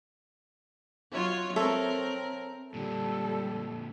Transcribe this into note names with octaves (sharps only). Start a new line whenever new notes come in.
F#3 F4 C#5
C4 A4 A#4 C#5 E5
A#2 D3 G3 A4